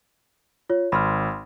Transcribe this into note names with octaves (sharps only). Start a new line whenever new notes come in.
F4 C#5
G#1 B5 C6 F6